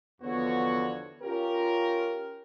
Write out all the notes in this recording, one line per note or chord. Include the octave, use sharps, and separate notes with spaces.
E2 D3 F3 B3 F#4 C#5
C#4 F4 G4 A#4